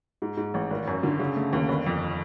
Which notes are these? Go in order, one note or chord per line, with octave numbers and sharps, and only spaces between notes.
G#2
G#2
A1
G#1
F#2
D3
C#3
A3
D#2
G1
F2